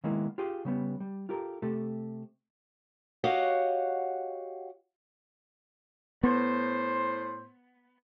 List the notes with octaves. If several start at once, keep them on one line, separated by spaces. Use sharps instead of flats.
D#3 G#3 A#3 B3 E4
F4 G4 G#4
C#3 G3 B3
G3
F4 G4 A4 A#4
C3 A3 G4 A4
F#4 G4 C#5 D#5 F5 F#5
A2 B3 C5